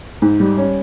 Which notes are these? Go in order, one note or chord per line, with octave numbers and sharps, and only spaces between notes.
G#2
G3
C#4